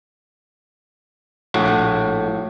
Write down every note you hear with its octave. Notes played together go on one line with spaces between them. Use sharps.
A#1 A2 F#4